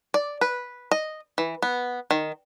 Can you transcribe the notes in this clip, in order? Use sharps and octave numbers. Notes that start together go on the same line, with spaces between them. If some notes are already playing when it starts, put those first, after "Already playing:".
D5
B4
D#5
E3
B3
D#3